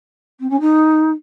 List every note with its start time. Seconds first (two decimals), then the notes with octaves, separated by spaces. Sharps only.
0.39 C4
0.50 C#4
0.60 D#4